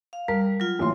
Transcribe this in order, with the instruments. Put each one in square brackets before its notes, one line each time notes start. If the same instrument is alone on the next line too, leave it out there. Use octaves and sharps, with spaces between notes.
[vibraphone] F5
[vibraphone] G3 [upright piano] A#4
[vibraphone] F#3 F4
[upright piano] A1 A#2 C6